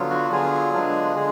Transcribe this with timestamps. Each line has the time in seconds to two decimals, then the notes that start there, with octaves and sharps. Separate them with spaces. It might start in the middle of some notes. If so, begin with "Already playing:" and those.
Already playing: D3 F#3 B3 F4
0.10 F#4
0.31 D3 F#3 B3 F4 G#4
0.73 D3 G#3 B3 D4 F4
1.16 D3 G#3 G#4